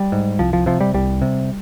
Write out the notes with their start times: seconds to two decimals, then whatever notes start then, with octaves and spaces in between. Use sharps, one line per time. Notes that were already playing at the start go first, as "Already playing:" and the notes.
Already playing: G3
0.12 G#2
0.39 C2 F3
0.53 F3
0.66 C3 F3
0.81 G3
0.94 C2 G3
1.22 C3